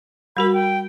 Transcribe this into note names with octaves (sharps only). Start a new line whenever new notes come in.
G3 F#4 A#4 B5
G5